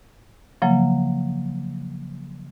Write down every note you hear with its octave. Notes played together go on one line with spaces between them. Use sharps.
C#3 F3 F#3 A#3